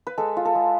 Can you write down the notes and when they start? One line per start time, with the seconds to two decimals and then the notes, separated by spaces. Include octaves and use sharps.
0.07 B4
0.18 G#3 A4
0.37 F4
0.45 A4
0.55 G#3